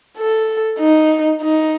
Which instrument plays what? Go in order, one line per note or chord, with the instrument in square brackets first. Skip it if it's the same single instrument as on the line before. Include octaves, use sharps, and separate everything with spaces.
[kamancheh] A4
D#4
D#4